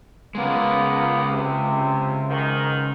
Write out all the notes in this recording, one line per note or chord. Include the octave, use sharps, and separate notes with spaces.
C#3 G#3 A#3 B3
C3
G#2 D#3